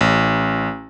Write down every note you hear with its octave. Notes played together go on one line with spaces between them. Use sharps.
A1